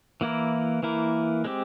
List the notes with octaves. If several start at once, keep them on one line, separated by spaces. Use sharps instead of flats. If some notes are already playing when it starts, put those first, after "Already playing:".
E3 A#3 E4 A#4
E3 A#3 E4 A#4
G#3 C4 G4